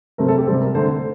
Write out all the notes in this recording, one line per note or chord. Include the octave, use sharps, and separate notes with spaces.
C3 F#3 A3 C4 A#4
A4
G4
C3 G3 C4 A4
A#4
D3 A3 C4 C5